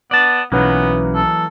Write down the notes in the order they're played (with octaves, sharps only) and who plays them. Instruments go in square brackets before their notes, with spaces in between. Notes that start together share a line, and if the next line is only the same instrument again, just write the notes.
[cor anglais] B3 [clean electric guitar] D5 A5
[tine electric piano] B1 C#4 B4 [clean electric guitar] E3 F#3 A#3 [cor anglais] B3
[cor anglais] A4